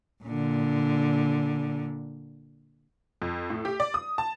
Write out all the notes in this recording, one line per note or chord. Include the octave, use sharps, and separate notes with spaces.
A#2 D3
F2
A2
G4
D5
D#6
A5